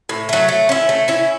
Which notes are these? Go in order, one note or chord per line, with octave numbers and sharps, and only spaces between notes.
A2
F#3 A3
A3
C#4 E4
A3
C#4 E4